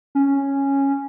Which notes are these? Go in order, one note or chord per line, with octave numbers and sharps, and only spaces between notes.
C#4